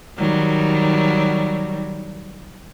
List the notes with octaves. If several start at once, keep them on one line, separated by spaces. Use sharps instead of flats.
D#3 F#3 G3